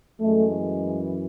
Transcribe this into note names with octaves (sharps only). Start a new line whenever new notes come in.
F#2 E3 G#3 A3